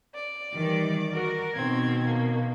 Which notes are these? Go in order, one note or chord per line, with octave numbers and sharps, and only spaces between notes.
D5
D#3 E3 G3
F#4 A#4
B2 D#3 C4 G#6
A#3